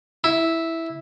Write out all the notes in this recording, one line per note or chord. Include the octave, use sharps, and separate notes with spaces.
E4